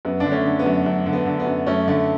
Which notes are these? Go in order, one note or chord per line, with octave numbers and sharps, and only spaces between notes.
F#2 B3
D3 D4
A3 C#4
D3
B3
F#2
F#2
D3
B3
D3
B3
F#2
F#2 A3 C#4
D3 A3